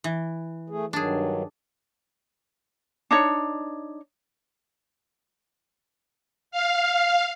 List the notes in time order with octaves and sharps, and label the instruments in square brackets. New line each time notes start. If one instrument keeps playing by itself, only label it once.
[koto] E3
[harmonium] A3 G#4
[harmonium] G2 D#3 F#3 [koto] D4 G#4
[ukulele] D4 D#4 C#5
[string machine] F5